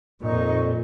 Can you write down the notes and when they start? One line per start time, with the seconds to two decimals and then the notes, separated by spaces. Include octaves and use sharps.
0.22 F2 A#2 D#4 C#6